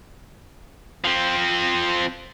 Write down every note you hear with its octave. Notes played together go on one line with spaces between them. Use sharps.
F3 C4